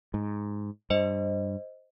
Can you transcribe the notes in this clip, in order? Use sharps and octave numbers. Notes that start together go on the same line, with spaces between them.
G#2
G2 C5 D#5